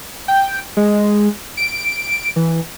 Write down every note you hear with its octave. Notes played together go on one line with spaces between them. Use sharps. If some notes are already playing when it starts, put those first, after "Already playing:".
G5
G#3
D7
E3